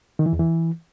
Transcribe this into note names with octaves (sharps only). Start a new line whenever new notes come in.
D#3
E3
E2
E3